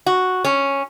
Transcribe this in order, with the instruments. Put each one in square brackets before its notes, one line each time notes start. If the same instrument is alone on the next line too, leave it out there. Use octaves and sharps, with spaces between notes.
[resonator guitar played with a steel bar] F#4
C#4